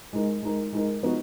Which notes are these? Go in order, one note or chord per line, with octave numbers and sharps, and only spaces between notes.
G#3 D#4 A#4
G#3 D#4 A#4
G#3 D#4 A#4
F3 B3 D#4 F#4